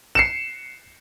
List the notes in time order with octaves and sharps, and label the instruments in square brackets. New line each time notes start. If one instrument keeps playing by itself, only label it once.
[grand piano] C7 C#7 E7